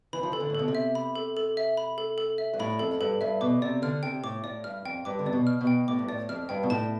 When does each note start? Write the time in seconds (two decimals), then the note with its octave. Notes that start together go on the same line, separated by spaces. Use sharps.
0.13 E3 B5
0.23 F3
0.32 E3 A4
0.40 D3
0.50 A2
0.55 B2 A4
0.68 C3
0.75 E5
0.95 B5
1.15 A4
1.37 A4
1.57 E5
1.77 B5
1.98 A4
2.18 A4
2.38 E5
2.53 G2
2.59 A2 B5
2.79 F2 A4
3.01 G2 A4
3.21 G2 E5
3.41 B2 D6
3.62 C3 D5
3.82 D3 F6
4.03 C3 G5
4.23 A2 D6
4.44 A2 D5
4.64 G2 F6
4.85 F2 G5
5.05 G2 D6
5.19 D3
5.26 C3 D5
5.33 B2
5.47 F6
5.61 B2
5.67 G5
5.88 A2 D6
5.99 G2
6.08 A2 D5
6.29 F2 F6
6.49 G2 G5
6.63 B2
6.70 A2 A5